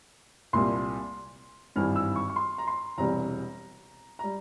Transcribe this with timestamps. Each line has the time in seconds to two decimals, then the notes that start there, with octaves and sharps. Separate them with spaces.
0.53 C2 A#2 G3 C6
1.76 G#1 G2 E3 G3 F6
1.96 E6
2.16 C#6
2.30 C#6
2.36 C6
2.58 A#5
2.67 C6
2.97 E1 E2 C3 G3 A#5
4.19 G3 A#5